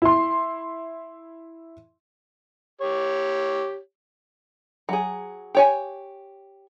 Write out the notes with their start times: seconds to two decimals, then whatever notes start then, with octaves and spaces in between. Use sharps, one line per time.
0.02 E4 C6
2.81 G4 C#5
4.89 F#3 G#4
5.55 G4 C#5 G#5